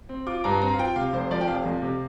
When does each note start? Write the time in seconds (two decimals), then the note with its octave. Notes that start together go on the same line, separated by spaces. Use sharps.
0.09 C4
0.27 F4 D6
0.44 G2 A#5
0.62 C4 A#5
0.73 F5
0.79 F4 G5
0.96 C3 F5
1.13 F1 C5
1.31 F3 D5
1.41 G5
1.47 F1 F5
1.65 F2
1.82 C3